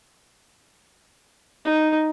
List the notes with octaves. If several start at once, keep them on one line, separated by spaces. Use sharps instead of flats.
D#4